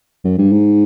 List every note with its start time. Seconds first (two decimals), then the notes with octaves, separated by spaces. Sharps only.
0.24 F#2
0.38 G2
0.52 G#2